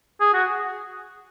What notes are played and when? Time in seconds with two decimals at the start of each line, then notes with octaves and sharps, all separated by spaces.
0.20 G#4
0.33 F#4